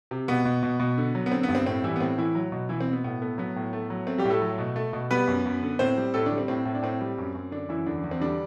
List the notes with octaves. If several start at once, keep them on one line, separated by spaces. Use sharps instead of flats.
C3
B2 B3
B2
B2
B2
D3
F#3
B3
D3 C4
B3
G2
C4
A2 C4
E3 G3 E4
B3
A2 C4
A2 E3 E4
F#3
B2
B2 E3 E4
C4
B2
B3
A2 B3
A3 B3
F#3 B3
A2
A3
F#3
A3 C4
G3 G4
A2
A3 A4
F#3
B2
A3
B2
G3 B3 B4
F#2
F#2
D3
A2 C4 C5
G3
A2 A3 A4
D3 D4
G3
C4
A2 C4
A2
D4
A2 C4
G3
F#2
F#2
D3 D4
F#2 E3 E4
E2 D3 D4
E2
C4
D3 G3 D4